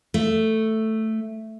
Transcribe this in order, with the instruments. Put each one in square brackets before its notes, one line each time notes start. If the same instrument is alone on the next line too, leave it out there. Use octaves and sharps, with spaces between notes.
[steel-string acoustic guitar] A3